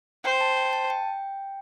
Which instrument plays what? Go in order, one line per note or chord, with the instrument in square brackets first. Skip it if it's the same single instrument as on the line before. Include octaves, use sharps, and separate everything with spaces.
[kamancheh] C5 [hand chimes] G5
[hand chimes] A5
G5
A5
G5